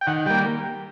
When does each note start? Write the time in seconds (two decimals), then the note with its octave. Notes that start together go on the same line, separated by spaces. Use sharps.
0.01 G5
0.07 D#3 F#5
0.26 G3 A#3 G5